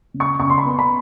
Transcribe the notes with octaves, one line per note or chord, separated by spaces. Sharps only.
C#3
C#6
C#3 C#6
C6
B5
B3 C6
B5